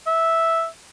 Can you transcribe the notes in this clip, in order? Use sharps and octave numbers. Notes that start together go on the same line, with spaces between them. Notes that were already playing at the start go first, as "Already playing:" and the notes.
E5